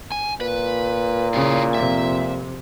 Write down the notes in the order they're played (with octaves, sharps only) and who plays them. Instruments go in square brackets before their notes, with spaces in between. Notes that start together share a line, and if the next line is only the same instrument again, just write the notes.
[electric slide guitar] G#5
[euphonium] A#2 [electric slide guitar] B4
[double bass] C#3 [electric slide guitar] E4 F4 D5
[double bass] F2 C3 [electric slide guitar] E5